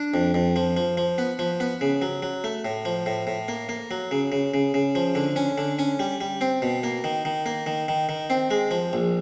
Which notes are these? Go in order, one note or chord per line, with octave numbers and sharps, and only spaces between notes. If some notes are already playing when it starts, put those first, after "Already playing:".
Already playing: D4
F2
F2
F3
F3
F3
B3
F3
B3
C#3
F#3
F#3
A3
A2
F3
A2
A2
A#3
A#3
F#3
C#3
C#3
C#3
C#3
F3
D3
C#4
D3
C#4
G3
G3
C4
B2
A#3
D#3
D#3
A#3
D#3
D#3
D#3
C4
G#3
F3
A#1